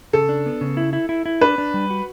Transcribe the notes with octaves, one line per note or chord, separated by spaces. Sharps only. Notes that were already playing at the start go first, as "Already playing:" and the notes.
C#3 A4
D4
B3
C#3
E4
E4
E4
E4
D4 B4
D4
G3
F#4